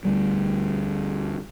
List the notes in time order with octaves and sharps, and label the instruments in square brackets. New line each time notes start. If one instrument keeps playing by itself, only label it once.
[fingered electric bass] D2 G3